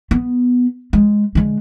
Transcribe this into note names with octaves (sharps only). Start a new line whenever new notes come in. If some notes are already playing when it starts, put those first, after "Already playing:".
B3
G#3
D3 G#3